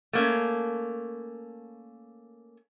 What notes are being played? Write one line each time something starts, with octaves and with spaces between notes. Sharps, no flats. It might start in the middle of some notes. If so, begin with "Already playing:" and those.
A3 A#3 C#4